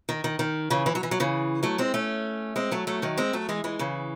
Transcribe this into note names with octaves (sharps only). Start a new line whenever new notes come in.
D#3
D#3
D#3
C#3 E3
E3
F#3
E3
F#3
C#3 E3
F#3 A3
G#3 C4
A3 C#4
G#3 C4
F#3 A3
F#3 A3
D#3 F#3
G#3 C4
F#3 A3
E3 G#3
E3 G#3
C#3 E3